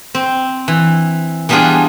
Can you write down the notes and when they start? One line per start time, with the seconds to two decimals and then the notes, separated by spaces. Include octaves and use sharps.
0.15 C4
0.68 E3
1.49 E3 G3 B3 D4 F4 G#4